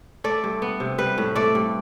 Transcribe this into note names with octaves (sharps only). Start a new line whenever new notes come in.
A3 D5
G2
B3
C3
G3 B4
A2
A3 D5
G2